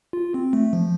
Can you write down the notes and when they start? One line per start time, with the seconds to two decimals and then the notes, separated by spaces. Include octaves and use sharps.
0.13 F4
0.34 C4
0.53 A3
0.73 F3